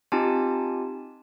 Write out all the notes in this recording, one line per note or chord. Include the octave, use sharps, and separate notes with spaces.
C4 D#4 F4 G4 G#5 A5